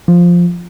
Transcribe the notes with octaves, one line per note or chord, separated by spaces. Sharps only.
F3